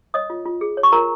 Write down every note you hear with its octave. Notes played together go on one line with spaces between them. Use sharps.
C#5 D#5 D#6
F4
F4
G#4
C#5
C#6
F4 A#4 A#5